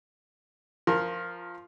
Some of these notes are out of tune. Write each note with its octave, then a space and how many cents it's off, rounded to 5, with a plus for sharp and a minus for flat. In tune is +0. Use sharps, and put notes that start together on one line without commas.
F3 +0 A#4 +0 C6 +40